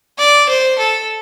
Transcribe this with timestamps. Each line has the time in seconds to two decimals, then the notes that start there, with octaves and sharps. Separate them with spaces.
0.18 D5
0.49 C5
0.79 A4